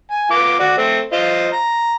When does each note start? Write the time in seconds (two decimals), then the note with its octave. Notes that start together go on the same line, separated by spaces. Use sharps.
0.11 G#5
0.31 B3 F4 D6
0.59 F#4 D5
0.77 A3 C4
1.13 F4 C5 D#5
1.53 A#5